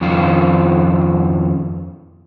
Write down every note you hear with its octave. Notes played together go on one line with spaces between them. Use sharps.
F2 D#3 C#4 F4